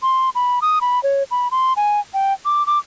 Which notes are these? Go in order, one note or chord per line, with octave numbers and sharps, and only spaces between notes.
C6
B5
D#6
B5
C#5
B5
C6
G#5
G5
D6
D6